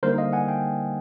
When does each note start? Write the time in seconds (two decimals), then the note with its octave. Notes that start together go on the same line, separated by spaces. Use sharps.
0.03 D3 G3 A#3 D#4 A#4 C5
0.18 D#5 F5
0.33 F#5 G#5
0.48 F5 G5